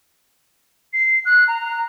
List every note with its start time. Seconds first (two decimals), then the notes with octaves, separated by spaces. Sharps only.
0.93 C7
1.25 F#6
1.48 A#5